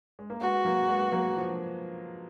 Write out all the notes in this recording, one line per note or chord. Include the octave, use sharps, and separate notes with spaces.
G#3
A#3
G#3 B3 F#4
F#3 A#3
G#3 B3
F#3 A#3
F3